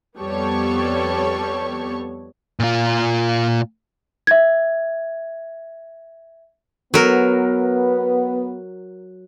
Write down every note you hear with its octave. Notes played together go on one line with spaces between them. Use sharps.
F2 G3 B3 A4 C#5 C#6
A#2 F4
E5 G#6
F#3 B3 A#4